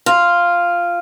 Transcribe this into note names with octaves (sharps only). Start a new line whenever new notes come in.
F4